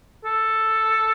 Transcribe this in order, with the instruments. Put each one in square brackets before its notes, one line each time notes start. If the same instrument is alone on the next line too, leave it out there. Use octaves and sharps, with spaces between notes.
[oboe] A4